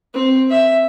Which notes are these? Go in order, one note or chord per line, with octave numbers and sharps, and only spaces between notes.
C4
E5